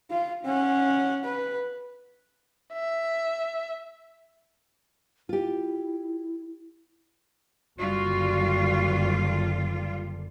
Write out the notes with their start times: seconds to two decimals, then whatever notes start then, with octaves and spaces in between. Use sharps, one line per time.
0.11 F4
0.44 C#4 F#5
1.24 B4
2.73 E5
5.29 E4 F4 G4
7.79 F#1 D3 G3 F4 F#4